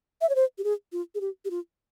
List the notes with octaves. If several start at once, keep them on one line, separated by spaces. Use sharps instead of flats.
E5
C#5
C5
G4
G#4
F4
G#4
G4
G4
F4